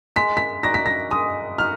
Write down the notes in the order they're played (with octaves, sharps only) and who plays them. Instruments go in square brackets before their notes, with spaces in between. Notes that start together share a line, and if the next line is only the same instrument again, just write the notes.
[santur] G#3 [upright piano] B6
[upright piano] B6
[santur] D#4 F#4 D5 [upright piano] A#6
[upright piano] B6
A#6
[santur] G#3 [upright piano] D#6
[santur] D#4 F#4 [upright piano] F6